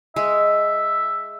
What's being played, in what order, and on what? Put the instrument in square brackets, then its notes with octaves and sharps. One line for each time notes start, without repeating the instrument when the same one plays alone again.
[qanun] G#3 [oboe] E5